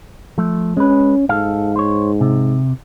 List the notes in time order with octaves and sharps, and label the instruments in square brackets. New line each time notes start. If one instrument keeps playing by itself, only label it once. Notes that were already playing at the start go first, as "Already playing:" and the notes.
[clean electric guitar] F3 A3
[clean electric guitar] G#3 B4 [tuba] C#4
[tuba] G#2 [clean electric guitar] A4 F5
[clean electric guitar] C5 C#5
C3